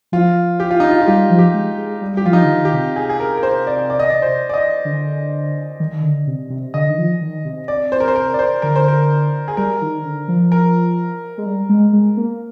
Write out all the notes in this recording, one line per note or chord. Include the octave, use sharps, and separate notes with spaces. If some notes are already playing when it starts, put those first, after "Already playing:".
F3 F4
G4
F4
D#4
F4
F4
G3 G4
F3
G4
G#3
G#3
G3
G3 G4
F3 F4
D#4
D3
D#3
G4
C3
G#4
G#4
A#4
A#4
C5
D5
D5
D#5
D5
C5
D5
D#5
D3
D#3
D3
C3
C3
D3 D#5
D#3
F3
D#3
C3
C3 D5
C5
A#4
C5
A#4
D5
C5
D3 A#4
C5
A#4
G#4
G3 A#4
D#3
D3
F3
A#4
G#3
G3
G#3
G#3
A#3